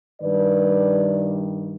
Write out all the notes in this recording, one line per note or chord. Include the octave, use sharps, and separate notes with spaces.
G2 D#3 G3 B4 D5